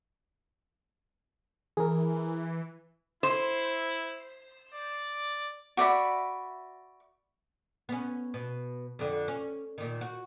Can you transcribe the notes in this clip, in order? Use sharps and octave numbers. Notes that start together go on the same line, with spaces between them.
E3 G#4 A#4
E4 C5
D5
F#4 D5 E5 B5
B3 C#4
B2
F2 D3
C#4
A#2 D#3
F#4